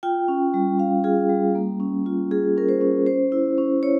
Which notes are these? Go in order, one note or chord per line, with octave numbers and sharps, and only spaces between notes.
F4 G5
C#4
G3
C#4 F5
F4 G#4
G3
A#3
C#4
F4
F4 G#4
C#4 A#4
C5
C#4
C#4 C5
E4
C#4
E4 C#5